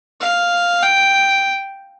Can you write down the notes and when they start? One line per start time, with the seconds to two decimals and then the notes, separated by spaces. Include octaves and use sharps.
0.21 F5
0.83 G5